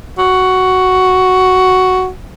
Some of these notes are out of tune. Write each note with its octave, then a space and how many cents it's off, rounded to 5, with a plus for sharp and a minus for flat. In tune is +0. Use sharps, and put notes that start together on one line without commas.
F#4 +5